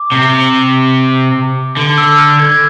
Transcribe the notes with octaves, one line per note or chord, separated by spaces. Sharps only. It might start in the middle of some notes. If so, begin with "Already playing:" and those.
Already playing: D6
C3
D3
E6
F6
G#6